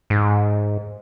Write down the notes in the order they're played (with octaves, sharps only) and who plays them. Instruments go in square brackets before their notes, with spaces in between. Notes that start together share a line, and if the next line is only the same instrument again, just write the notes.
[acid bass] G#2